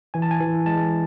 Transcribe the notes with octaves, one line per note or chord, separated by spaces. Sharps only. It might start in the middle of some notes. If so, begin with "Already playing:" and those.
E3 G#5
A5
G#5
E3
G#3 A5